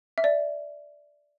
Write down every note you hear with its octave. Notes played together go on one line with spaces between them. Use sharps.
E5
D5